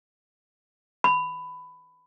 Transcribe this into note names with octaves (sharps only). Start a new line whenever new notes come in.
B5